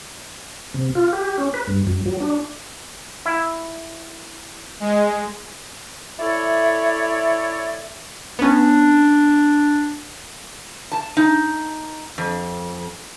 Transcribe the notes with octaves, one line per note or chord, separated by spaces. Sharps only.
C3
F4
G4
C#4
B4
G2
F#2
F#3
D4
E4
G#3
E4 A4 C#5 D5 E5
B3 C#4 D4
A5
D#4
F2